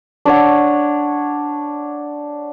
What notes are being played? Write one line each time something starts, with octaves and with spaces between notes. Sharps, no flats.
D4 C#5 F#5